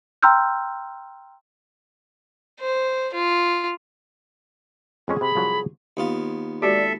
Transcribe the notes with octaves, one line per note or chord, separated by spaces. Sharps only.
G5 A#5 C6 E6 F6 G6
C5
F4
F2 G#3 C#4 G#4
C3 B5
C2 F3 F#3
D#2 B3 F4
G#3 F#4 G4 A4 D5 E5